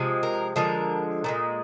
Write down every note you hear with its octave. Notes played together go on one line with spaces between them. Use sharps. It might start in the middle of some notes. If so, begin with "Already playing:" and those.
Already playing: C3 F3 G#3
A#4
D3 F3 G#3 A#4
A#2 F3 G#3